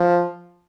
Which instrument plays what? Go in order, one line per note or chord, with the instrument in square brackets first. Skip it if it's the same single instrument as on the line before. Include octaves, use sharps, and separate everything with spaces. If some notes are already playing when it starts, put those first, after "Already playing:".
Already playing: [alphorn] F3